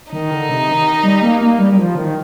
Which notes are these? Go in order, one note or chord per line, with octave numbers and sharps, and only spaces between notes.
D#3 D#4
D3
C3
D#3
G3
A#3
A#3
G3
G3
F3
D#3